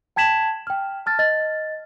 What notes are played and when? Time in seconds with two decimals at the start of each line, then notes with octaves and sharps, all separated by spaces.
0.16 G5 A5 G#6 B6 E7 F#7
0.67 G5 F6
1.06 A5 F6 A6
1.19 D#5 A6